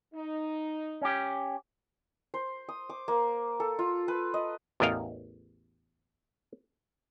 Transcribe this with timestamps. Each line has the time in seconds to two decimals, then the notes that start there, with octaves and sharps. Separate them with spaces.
0.14 D#4
1.01 C#4 G4
2.34 C5
2.69 D#6
2.90 D6
3.08 A#3
3.60 A4
3.79 F4
4.08 B4
4.34 D#5
4.80 A1 E2 A#4 D#5 F5